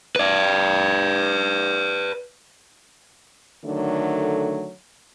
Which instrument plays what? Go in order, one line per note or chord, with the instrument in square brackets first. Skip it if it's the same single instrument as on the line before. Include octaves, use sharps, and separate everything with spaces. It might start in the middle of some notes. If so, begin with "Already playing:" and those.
[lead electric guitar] B4 D5
[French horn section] D3 D#3 F#3 A3